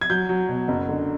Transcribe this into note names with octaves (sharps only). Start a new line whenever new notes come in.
G#6
F#3 G6
F#3
B2
F#1
D3